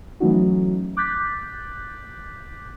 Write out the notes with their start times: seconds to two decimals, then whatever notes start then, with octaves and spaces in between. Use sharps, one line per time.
0.20 E3 F#3 A3 C#4 D#4 F#4
0.97 D6 F#6 G6 A6 B6